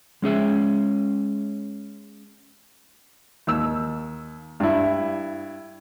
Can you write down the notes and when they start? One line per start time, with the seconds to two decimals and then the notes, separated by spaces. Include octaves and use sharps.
0.22 G#3 C#4 G#4 E5
3.47 D#2 E6
4.60 G2 E4